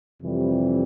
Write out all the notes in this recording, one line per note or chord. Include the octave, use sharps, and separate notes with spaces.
F2 C3 E3 G3